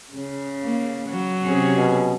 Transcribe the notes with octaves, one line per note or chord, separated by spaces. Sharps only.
C#3
A#3
F#3
C3 C#4 G#4
B2